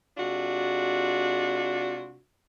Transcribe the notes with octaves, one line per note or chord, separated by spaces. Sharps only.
C3 G#3 D4 F4 F#4